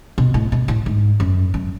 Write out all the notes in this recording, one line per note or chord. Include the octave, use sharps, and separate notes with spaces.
B2
A2
B2
A2
G#2
F#2
F#2